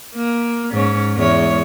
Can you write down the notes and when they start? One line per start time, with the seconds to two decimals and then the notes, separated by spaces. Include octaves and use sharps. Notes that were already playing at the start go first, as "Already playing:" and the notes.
0.15 A#3
0.72 G#2 C#4 C#5
1.15 E2 G#3 C#5